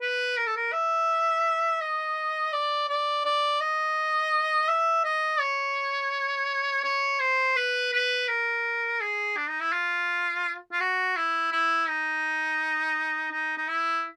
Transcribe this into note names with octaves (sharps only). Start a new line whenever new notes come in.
B4
A#4
A4
A#4
E5
D#5
D5
D5
D5
D#5
E5
D#5
C#5
C#5
C5
B4
B4
A#4
G#4
D4
D#4
E4
F4
F4
F#4
E4
E4
D#4
D#4
D#4
E4